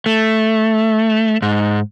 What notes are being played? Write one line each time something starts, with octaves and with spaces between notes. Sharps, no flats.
A3
G#2